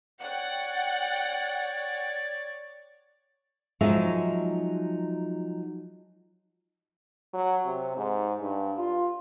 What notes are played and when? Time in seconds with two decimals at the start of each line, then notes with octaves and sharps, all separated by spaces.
0.21 C#5 D5 F#5 G5
3.81 F3 F#3 G#3 D#4 E5
7.34 F#3
7.66 C3
7.97 G#2
8.42 G2
8.78 F4